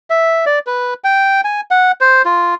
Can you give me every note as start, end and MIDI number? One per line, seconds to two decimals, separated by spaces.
0.10 0.45 76
0.46 0.59 74
0.67 0.94 71
1.04 1.41 79
1.44 1.61 80
1.71 1.92 78
2.01 2.22 72
2.25 2.55 65